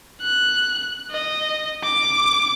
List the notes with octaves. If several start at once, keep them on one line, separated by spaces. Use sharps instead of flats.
F#6
D#5
D6